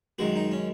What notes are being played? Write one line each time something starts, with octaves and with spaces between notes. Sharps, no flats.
F#2 D#3 G#3 F#4
D#4
C#4